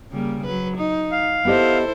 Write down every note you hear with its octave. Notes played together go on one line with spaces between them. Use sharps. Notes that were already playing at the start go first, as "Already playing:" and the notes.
C#3 G3 A#3
F#3 B4
D#4
F5
B3 E4 G4 A4 C5 D#5